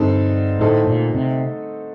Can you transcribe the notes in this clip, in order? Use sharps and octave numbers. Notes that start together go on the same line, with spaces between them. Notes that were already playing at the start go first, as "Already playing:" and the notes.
Already playing: G2 D3 G3 C4 D#4 A4
A2 D3 A3 D#4 A4 C5
A#2
C3